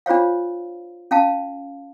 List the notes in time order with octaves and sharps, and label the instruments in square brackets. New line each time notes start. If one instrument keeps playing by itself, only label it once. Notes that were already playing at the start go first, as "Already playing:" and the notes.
[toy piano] D4 F4 C5 C#5 F5
C#4 F5 A5